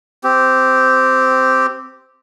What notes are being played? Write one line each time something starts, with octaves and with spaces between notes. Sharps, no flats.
C4 G4